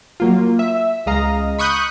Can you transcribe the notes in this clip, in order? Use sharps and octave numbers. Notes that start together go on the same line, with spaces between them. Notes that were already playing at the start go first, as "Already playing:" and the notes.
F#3 A#3 F4
E5
C#2 G#3 D#5 F5 A#5
B5 C#6 D#6 F#6 G6 C#7